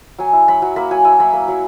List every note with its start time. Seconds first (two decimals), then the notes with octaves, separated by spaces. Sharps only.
0.19 F#3 G#5
0.33 E4
0.48 F#3 B5
0.62 F#3
0.76 A#3 B5
0.91 F#3 G#5
1.04 E4 G#5
1.19 F#3 B5
1.33 A#3
1.48 F#3